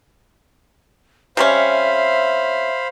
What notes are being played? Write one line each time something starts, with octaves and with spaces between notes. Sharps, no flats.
C3 G3 C#4 C5 E5 F5 B5